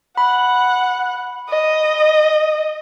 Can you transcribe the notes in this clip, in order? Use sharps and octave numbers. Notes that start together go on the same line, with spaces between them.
F#5 B5
D#5